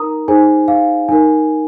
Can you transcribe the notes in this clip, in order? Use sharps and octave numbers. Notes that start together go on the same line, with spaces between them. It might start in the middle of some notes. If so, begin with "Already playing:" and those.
Already playing: D#4 A#4 A#5 D#6
D#4 G#4 C5 G#5
F5
D#4 A#4 G#5